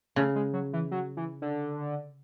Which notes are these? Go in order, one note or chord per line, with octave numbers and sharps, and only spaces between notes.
C#3 A3
G#3
F#3
E3
F#3
E3
D3